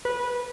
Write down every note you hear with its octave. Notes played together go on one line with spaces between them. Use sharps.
B4